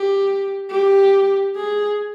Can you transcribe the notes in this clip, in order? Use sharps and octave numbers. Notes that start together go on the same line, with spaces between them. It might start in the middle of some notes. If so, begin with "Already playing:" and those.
Already playing: G4
G4
G#4